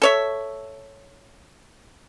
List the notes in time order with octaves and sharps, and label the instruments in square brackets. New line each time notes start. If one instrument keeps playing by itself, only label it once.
[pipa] A4 C#5 E5